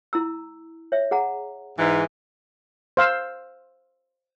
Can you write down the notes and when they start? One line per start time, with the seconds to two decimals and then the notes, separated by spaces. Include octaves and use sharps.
0.13 E4 A#5 E6
0.92 C#5 E5
1.11 G#4 F#5 A#5
1.79 G#2 E3
2.97 C5 F5 E6